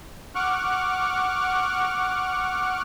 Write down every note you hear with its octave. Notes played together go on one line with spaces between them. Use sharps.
F#5 C#6 D6 F6 F#6